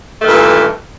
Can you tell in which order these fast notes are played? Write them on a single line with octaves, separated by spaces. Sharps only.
A3 D#3 G2 A#2 E3